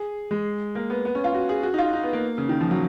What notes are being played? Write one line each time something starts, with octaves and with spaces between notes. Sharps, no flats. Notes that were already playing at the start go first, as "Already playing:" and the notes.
Already playing: G#4
G#3
A#3
B3
B3
C#4
F4
F#4
G#4
F#4
D#4
F4
D#4
B3
A#3
C#3
D#3
F3
F#3